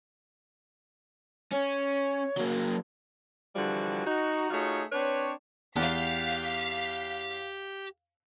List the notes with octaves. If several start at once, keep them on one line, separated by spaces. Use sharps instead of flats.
C#4 C#5
F#3 A#3
D3 E3 F3 G3 F#4 G#4
D#4 F#4
A3 D#4 F4 F#4 G#4 C#5
C4 D4 B4 C#5
E2 G4 F5 B6